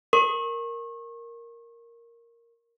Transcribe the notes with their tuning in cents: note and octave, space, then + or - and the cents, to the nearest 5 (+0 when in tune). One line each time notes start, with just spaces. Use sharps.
A#4 +0 C#6 -35